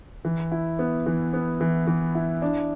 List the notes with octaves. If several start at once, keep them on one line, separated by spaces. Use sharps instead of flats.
E3
E4
B3
E3
B3
E3
E3
E4
D4